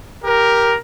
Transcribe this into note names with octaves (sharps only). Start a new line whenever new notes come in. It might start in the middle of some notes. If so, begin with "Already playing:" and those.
G4 A#4